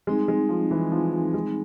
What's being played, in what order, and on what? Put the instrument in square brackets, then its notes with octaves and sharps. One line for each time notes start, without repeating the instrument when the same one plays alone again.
[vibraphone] G3 C4 D#4 G#4 [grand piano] G#3
[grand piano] G#3
F3
E3
F3
F3
G#3